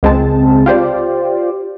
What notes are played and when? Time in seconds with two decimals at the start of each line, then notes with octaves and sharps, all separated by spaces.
0.03 C#2 G#3 C4 A5
0.66 F4 G4 C5 D5